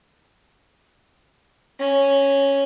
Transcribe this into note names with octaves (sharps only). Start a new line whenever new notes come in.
C#4